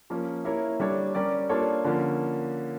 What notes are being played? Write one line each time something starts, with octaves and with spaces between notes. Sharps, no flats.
F3 A#3 C#4
A#3 E4 A#4 C#5
G3 D4 A4 C#5
G3 C#4 G4 A#4 D5
A#3 D4 F4 A4 C#5
D3 F3 A#3 C#4